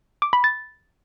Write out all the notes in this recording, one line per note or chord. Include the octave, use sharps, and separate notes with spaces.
D6
B5
A6